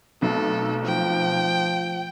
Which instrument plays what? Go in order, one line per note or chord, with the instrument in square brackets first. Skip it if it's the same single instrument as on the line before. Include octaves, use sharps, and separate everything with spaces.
[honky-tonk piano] B1 [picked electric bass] B2 A3 C4 [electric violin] A4
[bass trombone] F3 [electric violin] G5